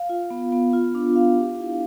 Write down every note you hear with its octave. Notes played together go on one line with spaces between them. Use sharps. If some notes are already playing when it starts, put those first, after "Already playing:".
Already playing: F5
F4
B3
B3
F4
D4
F5
G4
E4